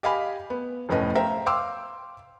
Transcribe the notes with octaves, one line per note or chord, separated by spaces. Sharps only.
G4 D#5 F5 G#5 B5
B3
F1 F2 A2 C#4 B4 D#5
C5 E5 F5 G5 A#5
F5 G5 C6 D6 E6